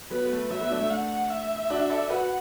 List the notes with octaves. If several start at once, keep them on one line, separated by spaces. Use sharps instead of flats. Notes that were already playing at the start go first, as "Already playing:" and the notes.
F#3 B3 B4
B3
A3
F#3 E5
F#3 B3
A3 D4
A3 D4
F#5
E5
D4 F#4
A4 D5
F#4 B4 F#5